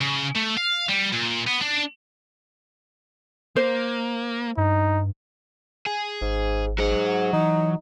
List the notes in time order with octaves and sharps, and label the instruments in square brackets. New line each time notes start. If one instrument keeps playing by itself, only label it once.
[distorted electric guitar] C#3
A3
F5
G3
A#2
B3
D4
[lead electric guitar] A#3 [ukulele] C5
[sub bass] G2 [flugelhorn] D#4
[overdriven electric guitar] G#4
[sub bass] G#1 [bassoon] G#2
[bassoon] G#2 [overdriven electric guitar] F#3 F#5
[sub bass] E3 [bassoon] D#4